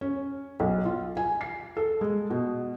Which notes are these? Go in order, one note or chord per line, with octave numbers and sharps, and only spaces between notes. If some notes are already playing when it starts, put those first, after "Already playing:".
C#4
B1
F4
G#5
C7
A4
G#3
B2